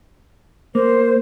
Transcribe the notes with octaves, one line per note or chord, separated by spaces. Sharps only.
A#3 C5